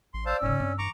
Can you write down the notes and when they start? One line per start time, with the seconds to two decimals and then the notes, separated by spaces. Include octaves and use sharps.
0.14 A1 C6
0.26 C5 D5 F5 A5 E6
0.42 F1 G#2 C#3 C#4
0.60 G2 C4
0.79 E3 A#5 C#6 D6